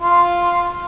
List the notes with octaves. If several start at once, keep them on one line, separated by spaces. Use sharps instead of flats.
F4